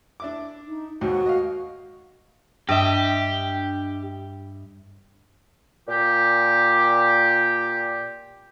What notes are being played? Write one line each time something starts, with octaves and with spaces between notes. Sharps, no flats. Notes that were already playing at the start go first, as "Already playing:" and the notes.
D4 E4 D6
D#4
D#2 G#2 F#4
D#5 F5
G2 D4 G4 D#5 E5
A#2 G4